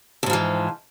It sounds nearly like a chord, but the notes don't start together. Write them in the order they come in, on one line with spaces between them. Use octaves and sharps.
F2 G#2 F3 E3